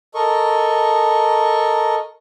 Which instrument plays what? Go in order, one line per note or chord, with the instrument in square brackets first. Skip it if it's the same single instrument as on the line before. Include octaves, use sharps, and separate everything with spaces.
[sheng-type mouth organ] A4 A#4 D#5 C#6